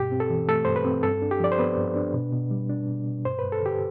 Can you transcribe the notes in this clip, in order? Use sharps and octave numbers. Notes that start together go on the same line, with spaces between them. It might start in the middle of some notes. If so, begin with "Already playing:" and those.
Already playing: G2 B2 G4
C4
A4
E3
A3 A4
G2 C5
B4
C4
G2 A4
D4
G4
F3 D5
C5
B3 B4
G2
D4
B2
B2
G3
D4
B2
B2
G2 C5
B4
G2
A4
D3 G4